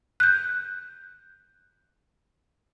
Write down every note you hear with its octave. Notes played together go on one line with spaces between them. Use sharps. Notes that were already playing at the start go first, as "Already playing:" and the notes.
F#6 G6